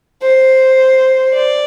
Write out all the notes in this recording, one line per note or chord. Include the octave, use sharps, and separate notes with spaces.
C5
D5